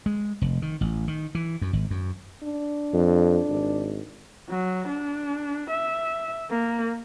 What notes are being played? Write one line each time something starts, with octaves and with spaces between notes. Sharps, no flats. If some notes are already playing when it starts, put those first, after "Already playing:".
G#3
F1
D#3
A1
D#3
E3
F#2
G#1
F#2
D4
F2
G#1
F#3
D4
E5
A#3